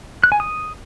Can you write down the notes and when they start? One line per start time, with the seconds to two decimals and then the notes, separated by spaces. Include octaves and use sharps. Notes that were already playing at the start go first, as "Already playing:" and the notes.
0.24 F#6
0.32 G#5
0.40 D#6